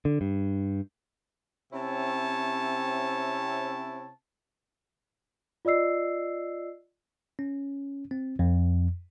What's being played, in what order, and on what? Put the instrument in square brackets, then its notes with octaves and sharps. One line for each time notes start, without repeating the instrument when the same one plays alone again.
[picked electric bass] D3
G2
[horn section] C3 C4 C#4 E4 C#5 A5
[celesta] F4 D5 D#5 E6 C7
[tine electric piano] C#4
C4
F2